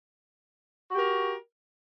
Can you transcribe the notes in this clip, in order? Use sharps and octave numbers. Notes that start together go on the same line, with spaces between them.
F#4 G4 A#4